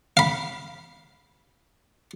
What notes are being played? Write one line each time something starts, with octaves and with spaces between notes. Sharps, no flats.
F5 B5